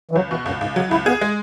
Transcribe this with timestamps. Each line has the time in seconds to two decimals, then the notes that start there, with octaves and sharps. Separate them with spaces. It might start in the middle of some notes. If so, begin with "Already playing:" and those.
0.11 E3
0.15 C#2 F#3
0.30 B2 E3
0.46 C#2 F#2
0.60 C#2 G#2
0.76 C#3 F#3
0.91 C#2 E4
1.06 B3 G#4
1.21 G#3